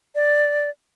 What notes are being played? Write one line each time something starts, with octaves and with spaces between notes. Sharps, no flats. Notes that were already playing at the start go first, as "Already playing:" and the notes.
D5